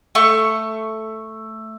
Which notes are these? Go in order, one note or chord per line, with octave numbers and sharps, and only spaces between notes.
A3 C#6